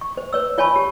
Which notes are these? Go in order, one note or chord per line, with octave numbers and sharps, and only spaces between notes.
C#6
C5
B4 C#5 E6
F4 C#5 G#5 A5 B5 C#6
G4